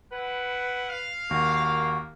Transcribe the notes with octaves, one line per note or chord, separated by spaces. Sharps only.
E4 B4 F#5
F5
D#2 A#3 F#4